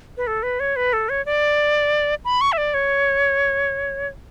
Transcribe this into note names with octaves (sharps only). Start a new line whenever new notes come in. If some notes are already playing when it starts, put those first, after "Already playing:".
B4
A4
B4
C#5
B4
A4
C#5
D5
B5
C#6
E5
D5
C#5